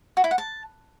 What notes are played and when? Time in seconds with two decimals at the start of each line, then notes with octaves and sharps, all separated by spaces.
0.17 F#4
0.24 E4
0.31 F#5
0.38 A5